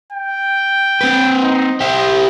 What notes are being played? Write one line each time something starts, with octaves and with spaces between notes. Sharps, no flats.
G5
C4 B4
D#4
E4 G4 C5